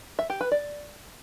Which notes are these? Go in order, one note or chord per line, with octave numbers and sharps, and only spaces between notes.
E5
G4
B4
D5